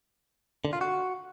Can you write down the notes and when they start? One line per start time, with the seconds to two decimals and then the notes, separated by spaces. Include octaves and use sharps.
0.65 D3
0.73 F4
0.81 F#4